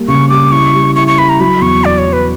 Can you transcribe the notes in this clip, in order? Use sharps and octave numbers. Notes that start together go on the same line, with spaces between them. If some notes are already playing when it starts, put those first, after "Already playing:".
Already playing: G3 A#3
C#3 C#6
G3 D6
E4 C#6
G3
E4 C#6
C#6
E4 B5
A#5
F#3 B5
E2 C#6
E2 D5
C#5
F#3
B4